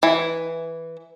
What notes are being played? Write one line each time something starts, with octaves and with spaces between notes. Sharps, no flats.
E3